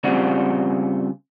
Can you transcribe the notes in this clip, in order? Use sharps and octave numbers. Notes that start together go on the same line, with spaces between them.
C#3 G3 C4 F4 F#4